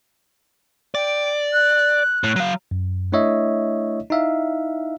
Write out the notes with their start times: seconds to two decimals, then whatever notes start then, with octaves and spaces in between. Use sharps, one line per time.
0.95 D5 G5
1.53 F#6
2.24 A2
2.36 F#3 F5
2.71 F#2
3.12 A3 D4 E4 C#5 D#5 E5
4.10 D#4 E4 E5 F5